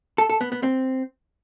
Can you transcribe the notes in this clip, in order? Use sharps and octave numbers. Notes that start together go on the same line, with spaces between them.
A4
A4
B3
B3
C4